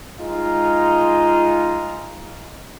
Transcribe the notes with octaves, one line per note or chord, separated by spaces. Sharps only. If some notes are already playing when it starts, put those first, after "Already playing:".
G#3 D#4 F4